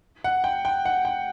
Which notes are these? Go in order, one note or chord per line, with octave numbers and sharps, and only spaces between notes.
F#5
G5
G5
F#5
G5